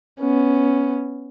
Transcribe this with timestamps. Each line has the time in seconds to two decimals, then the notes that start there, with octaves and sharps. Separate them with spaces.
0.20 B3 C#4